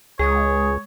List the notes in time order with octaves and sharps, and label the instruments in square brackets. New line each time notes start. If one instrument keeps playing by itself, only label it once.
[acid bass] C#2 [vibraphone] G#3 D#6 [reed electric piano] G#4 G#5 [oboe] C#5